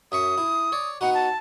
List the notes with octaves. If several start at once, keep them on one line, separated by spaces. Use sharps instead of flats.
F#2 E5 C#6 D#6
E4
C#5 D5
B3 D#4 F#4 F#5
A5